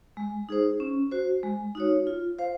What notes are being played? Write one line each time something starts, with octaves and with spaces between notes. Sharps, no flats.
G#3
D#4 G#4 C5
C#4
F#4 C5
G#3
D#4 F#4 C#5
F4
C5 F5